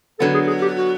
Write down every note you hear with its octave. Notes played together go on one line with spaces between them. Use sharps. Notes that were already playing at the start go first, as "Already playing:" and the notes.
D3 F#3 B3 A4
G#4
G#4
G4
F#4